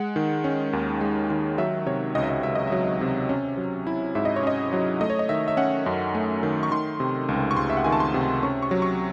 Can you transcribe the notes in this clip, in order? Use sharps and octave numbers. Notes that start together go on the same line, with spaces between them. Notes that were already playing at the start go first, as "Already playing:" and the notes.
Already playing: G#3 F#5
D#3
C#4
D#2
G#3
D#3
F#3 E5
C3 C#5
C#2 D#5
E5
D#5
C#2 E5
D#5
F#3 E5
C3
C#4
F#3
E4
G#2 E5
D#5
C#5
C#4 D#5
F#3
A3 D#5
C#5
D#5
D#3 E5
E5
C#4 F#5
F#2
A3
D#3
C#6
D#3 C6
C3
C#2
C#6
C#2 C6
E5
F#5
D#3 G#5
A5
C6
C3
C#4 C#6
C#6
F#3
C#6